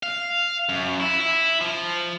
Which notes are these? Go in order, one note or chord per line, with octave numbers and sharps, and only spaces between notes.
F5
F#2
E4
E4
F3